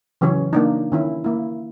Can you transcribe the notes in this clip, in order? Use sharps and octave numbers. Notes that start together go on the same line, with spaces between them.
C#3 E3 F#3 C#4 C#5
A#3 D4 D#4
D#3 C#4 E4
A#3 E4